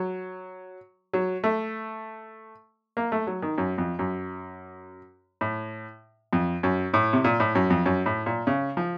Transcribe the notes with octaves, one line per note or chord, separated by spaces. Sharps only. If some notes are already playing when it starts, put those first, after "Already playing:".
Already playing: F#3
F#3
A3
A#3
A3
F#3
D#3
F#2
F2
F#2
A2
F2
F#2
A2
C3
A#2
A2
F#2
F2
F#2
A2
A#2
C#3
F3